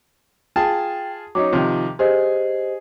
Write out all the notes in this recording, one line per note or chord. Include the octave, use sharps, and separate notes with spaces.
F4 G#4 G5 A5
F#3 C#4 D#4 D6
C3 D#3 F3
G4 G#4 C5 D#5